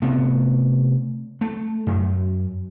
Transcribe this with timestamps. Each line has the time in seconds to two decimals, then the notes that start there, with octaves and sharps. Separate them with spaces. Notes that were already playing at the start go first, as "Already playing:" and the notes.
0.02 C3 A3 B3
1.41 A3
1.87 F#2